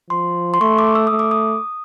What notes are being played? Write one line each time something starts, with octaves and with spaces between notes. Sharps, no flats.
F3 C6
C6
A3 C#6
D6
E6
D#6
A3
D6
D#6